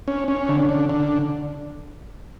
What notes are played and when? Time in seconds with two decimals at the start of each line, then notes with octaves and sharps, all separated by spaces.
0.08 C#4
0.28 C#4
0.49 D3
0.69 D3
0.89 D3